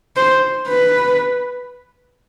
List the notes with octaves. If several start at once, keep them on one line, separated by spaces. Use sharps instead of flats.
C5
B4